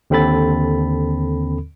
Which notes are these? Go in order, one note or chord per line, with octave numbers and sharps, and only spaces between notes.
D#2 D3 C4 A4 B5 A6